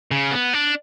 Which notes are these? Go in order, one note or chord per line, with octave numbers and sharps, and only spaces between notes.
C#3
B3
D4